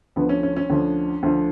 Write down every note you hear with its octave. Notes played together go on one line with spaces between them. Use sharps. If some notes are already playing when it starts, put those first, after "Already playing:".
D2 D3 F3 B3
C#4
C#4
C#4
D2 D3 F3
D2 D3 F3